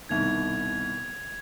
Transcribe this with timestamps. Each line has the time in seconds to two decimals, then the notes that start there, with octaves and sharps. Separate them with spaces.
0.09 C2 B2 D#3 G#6 F7